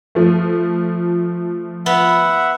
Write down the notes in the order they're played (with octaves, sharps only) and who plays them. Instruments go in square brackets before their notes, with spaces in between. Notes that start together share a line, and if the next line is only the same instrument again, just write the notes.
[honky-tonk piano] F3 A3
[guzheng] B3 [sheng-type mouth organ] E5 F#5